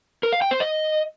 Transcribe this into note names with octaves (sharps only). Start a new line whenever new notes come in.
A#4
F5
G5
C5
D#5